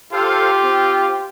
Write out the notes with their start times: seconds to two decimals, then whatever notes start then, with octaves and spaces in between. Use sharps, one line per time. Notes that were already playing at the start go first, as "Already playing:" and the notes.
0.13 F4 G4 A4 C5 F5
0.63 C4